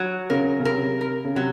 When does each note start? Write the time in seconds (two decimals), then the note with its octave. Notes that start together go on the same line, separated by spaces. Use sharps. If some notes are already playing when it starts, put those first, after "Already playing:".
Already playing: F#3
0.30 C#3 A#4
0.60 C#3
0.64 C3 A#4
1.01 A#4
1.25 C#3
1.35 C3 F#3